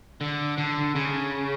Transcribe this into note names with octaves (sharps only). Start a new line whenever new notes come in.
D3
D3
C#3